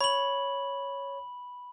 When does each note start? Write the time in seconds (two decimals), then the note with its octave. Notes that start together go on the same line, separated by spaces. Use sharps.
0.01 C#5 B5 F#7